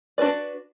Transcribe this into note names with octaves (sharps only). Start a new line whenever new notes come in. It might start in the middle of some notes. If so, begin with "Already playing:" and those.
D4 F#4 B4 D5